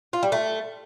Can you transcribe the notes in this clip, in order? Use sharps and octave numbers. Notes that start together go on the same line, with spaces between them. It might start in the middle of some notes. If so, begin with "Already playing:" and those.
F4
G3
A3